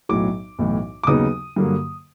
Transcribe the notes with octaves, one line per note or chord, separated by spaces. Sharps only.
B1 A2 F#3 D6
B1 A2 E3
D6
D#2 C#3 F#3 B3 D#4 D#6
G2 D3 F#3 A#3